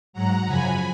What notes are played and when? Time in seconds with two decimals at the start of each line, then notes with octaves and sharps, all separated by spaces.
0.13 G#2 F#3 F#5 A#5
0.46 F#2 C#3 F3 G#5 B5